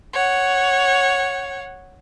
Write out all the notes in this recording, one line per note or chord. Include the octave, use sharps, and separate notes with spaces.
C#5 F#5